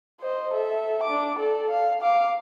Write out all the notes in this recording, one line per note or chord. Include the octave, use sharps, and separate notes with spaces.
C5 D#5
A4 E5
D4 D6
A4 D5
F5
F5 D6